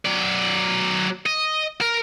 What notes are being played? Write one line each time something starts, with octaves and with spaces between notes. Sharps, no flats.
F#3 D5
D#5
A#4